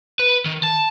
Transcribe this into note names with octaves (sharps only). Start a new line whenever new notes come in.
B4
D#3
A5